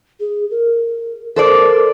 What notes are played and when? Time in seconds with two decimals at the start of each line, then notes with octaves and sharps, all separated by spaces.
0.20 G#4
0.51 A#4
1.36 A4 A#4 C5 D5